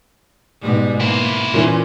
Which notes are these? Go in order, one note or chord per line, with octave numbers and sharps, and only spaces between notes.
G#2 B2 G3
A#3 E4 C5
A#2 E3 C#4